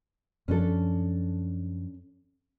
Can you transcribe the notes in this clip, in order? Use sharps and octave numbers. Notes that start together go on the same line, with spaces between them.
F#2 F3 C#4 D4 A4